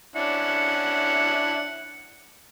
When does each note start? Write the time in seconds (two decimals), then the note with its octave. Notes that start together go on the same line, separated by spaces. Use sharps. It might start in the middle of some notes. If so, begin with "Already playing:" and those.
0.16 C#4 D4 E4 F#5